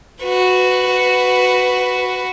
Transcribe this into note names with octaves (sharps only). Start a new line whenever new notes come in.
F#4 B4